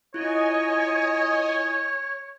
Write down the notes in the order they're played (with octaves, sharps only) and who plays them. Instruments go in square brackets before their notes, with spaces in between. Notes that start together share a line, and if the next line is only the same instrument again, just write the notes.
[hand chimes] E4 F4 [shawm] C#5 [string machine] D#5 G#5